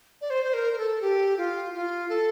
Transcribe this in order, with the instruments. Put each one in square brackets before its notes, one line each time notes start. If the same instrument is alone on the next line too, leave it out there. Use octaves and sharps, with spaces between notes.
[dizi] D5
C5
C5
A#4
A#4
A4
G4
F4
F4
A4